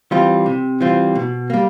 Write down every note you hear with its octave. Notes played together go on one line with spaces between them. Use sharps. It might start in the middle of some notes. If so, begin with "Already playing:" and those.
E3 G3 C4 F4
C3
E3 G3 C4 F4
B2
G3 A#3